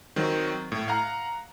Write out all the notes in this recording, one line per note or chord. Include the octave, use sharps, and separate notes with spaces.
D#3 F#3 C4 F#4
A2
F5 F#5 A#5